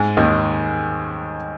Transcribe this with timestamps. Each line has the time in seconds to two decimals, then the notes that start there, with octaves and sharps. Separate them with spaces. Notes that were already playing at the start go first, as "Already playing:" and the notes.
Already playing: G#2 G#3
0.17 D#2 D#3